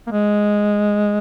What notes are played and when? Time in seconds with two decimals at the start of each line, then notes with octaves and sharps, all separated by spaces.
0.07 A#3
0.11 G#3